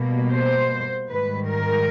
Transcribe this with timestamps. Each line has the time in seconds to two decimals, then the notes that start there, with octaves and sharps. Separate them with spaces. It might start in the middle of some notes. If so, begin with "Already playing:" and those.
Already playing: B2 G3 A#3
0.32 C5
1.09 G#2 D#3 G3 B4
1.48 A#4